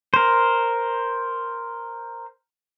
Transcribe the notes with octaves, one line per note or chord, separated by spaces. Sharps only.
A#4 C5